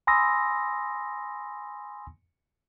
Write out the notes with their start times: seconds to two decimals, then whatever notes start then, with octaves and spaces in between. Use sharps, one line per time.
0.07 G#5 B5 C6 D#6 E6 A#6